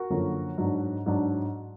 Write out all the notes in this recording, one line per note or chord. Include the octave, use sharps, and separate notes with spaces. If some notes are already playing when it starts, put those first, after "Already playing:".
Already playing: F#4 A#4
F#2 D3 F3 A#3
G#2 F#3 D4
G#2 F#3 D4